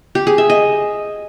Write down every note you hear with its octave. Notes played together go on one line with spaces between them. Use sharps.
G4
G#4
E5
D#5